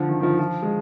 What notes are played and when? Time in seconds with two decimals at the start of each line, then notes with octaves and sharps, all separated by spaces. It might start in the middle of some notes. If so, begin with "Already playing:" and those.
Already playing: D3 F3
0.09 D#3
0.20 D#3
0.23 F3
0.39 F3
0.63 G#3